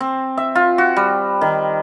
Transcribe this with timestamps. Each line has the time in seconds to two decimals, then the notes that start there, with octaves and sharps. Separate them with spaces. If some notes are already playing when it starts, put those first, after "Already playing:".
0.01 C4
0.37 E5
0.55 F4
0.78 F#4
0.96 G3
1.41 D#3